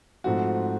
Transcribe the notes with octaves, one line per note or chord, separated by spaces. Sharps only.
G#2 F3 A3 C4 F#4